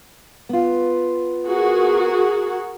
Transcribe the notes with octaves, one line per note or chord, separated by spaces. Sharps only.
B3 F4
F#4 G#4 A#4